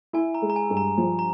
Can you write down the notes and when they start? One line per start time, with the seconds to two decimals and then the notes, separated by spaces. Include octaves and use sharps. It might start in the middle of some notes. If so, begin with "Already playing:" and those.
0.13 E4 G#5
0.35 A#5
0.42 G#3
0.50 A#5
0.56 G#5
0.70 G2
0.77 A#5
0.98 F3
1.19 A#5